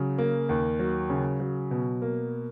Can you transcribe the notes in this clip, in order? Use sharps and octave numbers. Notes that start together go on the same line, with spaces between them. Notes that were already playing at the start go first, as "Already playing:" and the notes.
Already playing: C#3 F#3
A#3
D#2
F#3
C#3
F#3
B2
A#3